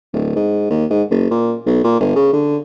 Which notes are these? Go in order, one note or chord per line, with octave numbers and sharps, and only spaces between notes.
D1
G#2
D#2
G#2
F#1
A#2
B1
A#2
G1
C#3
D3